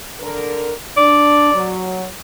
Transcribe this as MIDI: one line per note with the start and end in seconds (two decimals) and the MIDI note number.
0.20 0.72 50
0.20 0.72 70
0.97 1.53 62
0.97 1.75 74
1.53 2.05 54